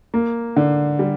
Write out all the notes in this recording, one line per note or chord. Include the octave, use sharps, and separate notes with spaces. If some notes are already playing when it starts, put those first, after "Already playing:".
A#3
D3
G3